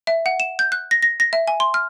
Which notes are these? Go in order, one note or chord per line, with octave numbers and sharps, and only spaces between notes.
E5
F#5
E7
G6
F#6
A#6
A#6
A#6
E5
G#5
C6
F6